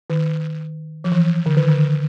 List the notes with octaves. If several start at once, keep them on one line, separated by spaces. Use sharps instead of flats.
D#3
F3
E3
D3
D#3
D3